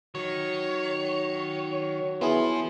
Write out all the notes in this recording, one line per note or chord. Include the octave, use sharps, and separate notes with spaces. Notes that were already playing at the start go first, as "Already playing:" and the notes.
D#3 F#3 C#5
F3 B3 E4 G#4